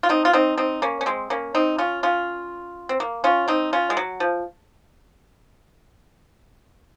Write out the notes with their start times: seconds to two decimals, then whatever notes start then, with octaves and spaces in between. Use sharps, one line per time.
0.03 F4
0.09 C4 D#4
0.25 F4
0.33 C4 D#4
0.57 C4 D#4
0.82 A#3 C#4
1.01 C#4
1.06 G#3 C4
1.30 A#3 C#4
1.55 C4 D#4
1.78 C#4 F4
2.03 C#4 F4
2.89 C4
3.00 A#3
3.24 C#4 F4
3.48 C4 D#4
3.73 C#4 F4
3.90 G#3
3.97 F#3
4.20 F3